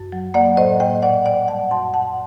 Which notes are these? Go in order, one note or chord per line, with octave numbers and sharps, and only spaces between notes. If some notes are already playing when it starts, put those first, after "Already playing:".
Already playing: F#2
F#3
A#3 D5 F#5
A2 C5 D#5
A2 D#5 G5
A#2 D5 F#5
A#2 D5 F#5
G3 F#5 A5
F#2 A5 C6
F#2 F#5 A5